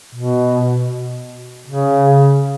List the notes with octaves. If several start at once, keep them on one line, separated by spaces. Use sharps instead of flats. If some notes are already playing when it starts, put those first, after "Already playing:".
B2
C#3